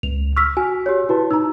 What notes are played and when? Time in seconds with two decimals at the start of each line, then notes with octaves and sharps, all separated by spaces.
0.03 C#2 F7
0.36 C#6 E6 F6 B6
0.57 F#4 G#5
0.86 G4 C#5
1.09 E4 F#4 B4 A5
1.31 D#4 A#5 E6